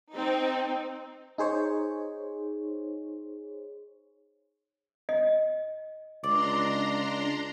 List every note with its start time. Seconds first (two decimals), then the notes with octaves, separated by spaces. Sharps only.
0.13 C4 D#4
1.38 D#4 G#4 C5 C#5
5.09 D#5
6.24 C#2 D4 D5 A#5 C6